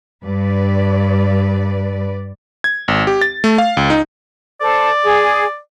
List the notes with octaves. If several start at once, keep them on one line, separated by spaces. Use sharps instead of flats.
G2 B4 D5
G#6
G#1
G4
A6
A3
F5
C#2
D#4
A4 C5 D5
G#4